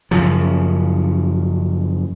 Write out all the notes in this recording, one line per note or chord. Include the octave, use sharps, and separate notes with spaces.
F#2 C#3 F3